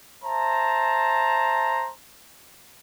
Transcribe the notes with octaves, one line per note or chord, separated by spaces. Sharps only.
C5 E5 A5 A#5